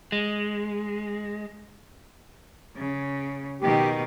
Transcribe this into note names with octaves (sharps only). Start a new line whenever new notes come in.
G#3
C#3
B2 D#3 G4